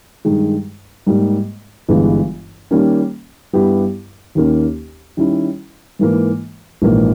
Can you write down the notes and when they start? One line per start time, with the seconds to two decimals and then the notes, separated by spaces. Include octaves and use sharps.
0.25 G2 D#3 G#3
1.07 G#2 G3 A#3
1.88 G1 G2 E3 G#3 B3
2.71 D#3 G3 A#3 C#4
3.53 G2 G3 B3 E4 G4
4.35 D#2 D#3 A#3 C#4
5.17 D#3 G3 C#4 E4
5.99 G#2 E3 A#3
6.82 A#1 G#2 E3 A#3